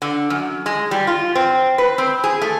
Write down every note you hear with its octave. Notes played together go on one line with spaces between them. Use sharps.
D3
F#2
G#3
G3
F4
C4
B4
C4
G#4
A3